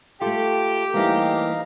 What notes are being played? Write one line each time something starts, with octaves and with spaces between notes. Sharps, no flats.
A3 F4 G4 A4
E3 G3 A3 A#3 D#4 C5 F5 A#5